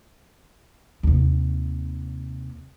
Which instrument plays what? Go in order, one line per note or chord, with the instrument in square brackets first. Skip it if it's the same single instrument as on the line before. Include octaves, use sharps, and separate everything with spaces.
[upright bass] D#2 C3